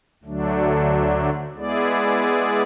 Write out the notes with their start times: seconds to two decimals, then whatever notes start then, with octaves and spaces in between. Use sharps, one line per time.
0.24 D2 D3 F#3 A3 D4
1.56 G#3 B3 E4 G#4 D5